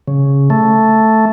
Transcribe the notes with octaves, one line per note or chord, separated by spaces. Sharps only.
C#3
A3